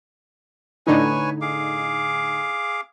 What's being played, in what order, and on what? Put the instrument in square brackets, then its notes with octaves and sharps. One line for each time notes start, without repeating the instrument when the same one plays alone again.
[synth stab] A2 D3 D#4 [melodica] B4 C#5 G#5
[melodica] G#4 F5 D6